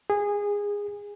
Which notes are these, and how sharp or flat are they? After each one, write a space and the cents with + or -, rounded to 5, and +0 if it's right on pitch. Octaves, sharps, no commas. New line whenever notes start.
G#4 -20